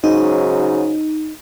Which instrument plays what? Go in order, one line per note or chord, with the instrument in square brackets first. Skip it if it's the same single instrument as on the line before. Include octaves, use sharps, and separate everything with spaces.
[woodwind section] G#2 C#3 F#3 [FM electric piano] D#4